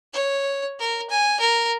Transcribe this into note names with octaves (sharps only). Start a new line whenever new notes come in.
C#5
A#4
G#5
A#4